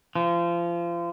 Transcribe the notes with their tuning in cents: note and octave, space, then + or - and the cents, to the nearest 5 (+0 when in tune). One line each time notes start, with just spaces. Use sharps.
F3 -30